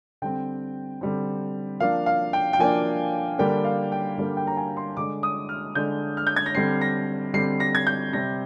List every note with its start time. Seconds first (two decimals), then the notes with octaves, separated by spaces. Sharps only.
0.22 D3 G3 C4 G5
1.01 D3 G3 C4
1.80 F3 A#3 D4 F5
2.06 F5
2.33 G5
2.53 G5
2.59 F3 A#3 D4 G#5
3.39 D3 G3 A#3 D4 G5
3.65 F5
3.92 G5
4.17 D3 G3 A#3 D4
4.37 G5
4.47 A#5
4.57 G#5
4.77 C6
4.97 D3 G#3 D4 D6
5.23 D#6
5.49 F6
5.75 D3 G#3 D4 G6
6.17 F6
6.27 G6
6.36 G#6
6.46 A#6
6.55 D3 G3 C4 C7
6.81 A#6
7.33 D3 G3 C4 C7
7.60 A#6
7.75 G#6
7.87 G6
8.13 C3 G3 C4 A#6